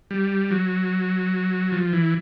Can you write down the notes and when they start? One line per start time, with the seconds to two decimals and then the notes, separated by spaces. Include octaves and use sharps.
0.11 G3
0.51 F#3
1.72 F3
1.93 E3